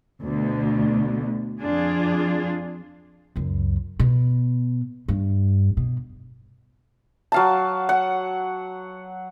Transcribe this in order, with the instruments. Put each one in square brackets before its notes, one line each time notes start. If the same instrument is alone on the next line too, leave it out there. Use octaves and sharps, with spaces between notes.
[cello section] D2 B2 D3 A3
F2 D4 F4 G#4
[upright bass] C#2 F#2
B2
G2
B2
[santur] F#3 F5 A5
F#5